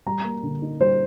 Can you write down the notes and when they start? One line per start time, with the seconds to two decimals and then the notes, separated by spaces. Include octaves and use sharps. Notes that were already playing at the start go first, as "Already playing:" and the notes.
0.06 G3 A#5
0.24 A#3
0.43 D3
0.62 D#4
0.80 G3 C5